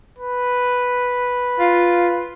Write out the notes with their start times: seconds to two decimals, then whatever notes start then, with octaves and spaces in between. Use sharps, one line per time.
0.18 B4
1.60 F4